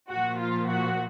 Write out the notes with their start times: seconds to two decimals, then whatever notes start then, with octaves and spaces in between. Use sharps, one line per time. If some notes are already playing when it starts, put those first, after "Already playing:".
0.10 A#2 F3 F#4
0.40 F4
0.70 F#4